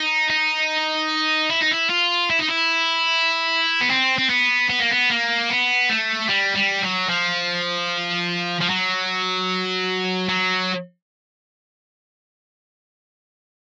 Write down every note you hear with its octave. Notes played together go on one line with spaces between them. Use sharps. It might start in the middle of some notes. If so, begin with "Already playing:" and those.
Already playing: D#4
D#4
E4
D#4
E4
F4
E4
D#4
E4
B3
C4
C4
B3
B3
A#3
B3
A#3
B3
A3
G3
G3
F#3
F3
F3
F#3
F#3